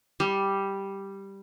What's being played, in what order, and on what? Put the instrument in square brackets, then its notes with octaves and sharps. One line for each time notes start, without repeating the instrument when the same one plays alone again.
[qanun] G3